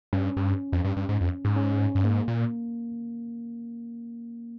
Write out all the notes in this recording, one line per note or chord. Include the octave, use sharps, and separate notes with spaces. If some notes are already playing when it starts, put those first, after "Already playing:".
G2 C#4
G2
F2
G2
G2
G#2
F2
G#2
C#4
G2
G#2 A#3
A#2